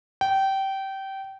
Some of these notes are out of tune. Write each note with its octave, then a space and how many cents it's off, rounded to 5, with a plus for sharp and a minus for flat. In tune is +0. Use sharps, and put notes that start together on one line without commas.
G5 -20